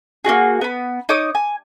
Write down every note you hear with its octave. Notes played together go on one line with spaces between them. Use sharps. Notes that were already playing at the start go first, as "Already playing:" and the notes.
A#3 C#4 F#4 G#4
B3 B5
D#4 C#5 D6 D#6
G#5